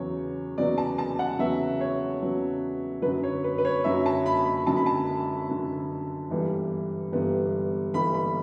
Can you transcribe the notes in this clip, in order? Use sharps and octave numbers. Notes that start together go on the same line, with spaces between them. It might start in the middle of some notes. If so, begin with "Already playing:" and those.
Already playing: E2 C#3 F#3 B3 C#5
E2 C#3 F#3 B3 D5
A5
A5
F#5
E2 C#3 F#3 B3 E5
C#5
E2 C#3 F#3 B3
F#2 D3 F#3 B4
C#5
B4
B4
C#5
F#2 D3 F#3 E5
A5
B5
B5
F#2 D3 F#3 A5
B5
A5
F#2 D3 F#3
G1 G2 E3 G3 B3
G1 G2 E3 G3 B3
G1 G2 E3 G3 B3 B5
B5